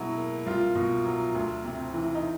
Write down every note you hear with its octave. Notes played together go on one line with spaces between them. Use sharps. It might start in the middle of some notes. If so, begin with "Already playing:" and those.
Already playing: B2 F#3 G#3 E4
A#3
C2 F4
B2
F#3
D2
C3
E3
D#4